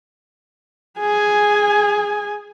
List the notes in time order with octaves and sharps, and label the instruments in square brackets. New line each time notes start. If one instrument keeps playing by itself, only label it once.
[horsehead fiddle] G#4 G#5